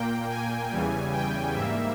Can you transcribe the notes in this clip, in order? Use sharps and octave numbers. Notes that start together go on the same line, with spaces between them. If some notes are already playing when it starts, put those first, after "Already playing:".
Already playing: A#2 A#3 G5
G#5
E2 C#3 E3 G3
G5
G#2 G3 A#3 E5